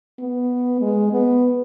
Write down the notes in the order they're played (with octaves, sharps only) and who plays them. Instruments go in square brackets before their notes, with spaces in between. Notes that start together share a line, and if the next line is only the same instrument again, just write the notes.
[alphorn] B3
G#3
B3